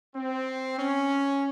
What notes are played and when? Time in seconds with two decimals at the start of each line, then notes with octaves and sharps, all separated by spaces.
0.16 C4
0.79 C#4